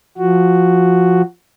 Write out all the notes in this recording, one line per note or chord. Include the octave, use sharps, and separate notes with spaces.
F3 F#4